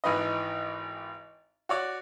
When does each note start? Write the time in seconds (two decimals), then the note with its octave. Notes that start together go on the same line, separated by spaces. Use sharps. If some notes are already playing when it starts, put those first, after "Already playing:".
0.04 G#1 E3 D#4 B4 D#5
1.69 F#4 C#5 D5